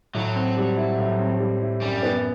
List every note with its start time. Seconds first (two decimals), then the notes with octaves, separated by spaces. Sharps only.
0.15 A2 F#3
0.36 C4
0.57 G3
0.77 E4
0.98 A2
1.19 C4
1.39 G3
1.61 E4
1.81 F#2 G3
2.03 B3